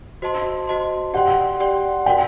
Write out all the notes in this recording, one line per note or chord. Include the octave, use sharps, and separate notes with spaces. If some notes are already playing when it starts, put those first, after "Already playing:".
F#4 C5 D#5 A5 C6
F#4 C5 D#5 A5 C6
G4 D5 F#5 G5 C6
G4 D5 G5 C6
F#4 A#4 D5 F#5 G5 C6